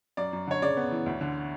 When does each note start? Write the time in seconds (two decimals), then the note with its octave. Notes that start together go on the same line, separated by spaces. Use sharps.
0.17 F#2 D5
0.33 F#2
0.47 D3 C#5
0.62 C#3 D5
0.77 B3
0.91 E3
1.06 D2
1.21 D3